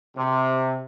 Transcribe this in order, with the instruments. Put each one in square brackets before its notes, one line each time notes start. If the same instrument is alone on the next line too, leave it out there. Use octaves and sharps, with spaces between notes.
[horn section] C3